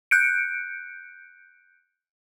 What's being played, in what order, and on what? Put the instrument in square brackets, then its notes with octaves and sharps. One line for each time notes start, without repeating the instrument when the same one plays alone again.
[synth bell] F#6 G6 C#7 D7